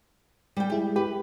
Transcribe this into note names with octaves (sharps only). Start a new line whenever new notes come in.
G3 G5
G#3 E4 G4 G#4
G4 B4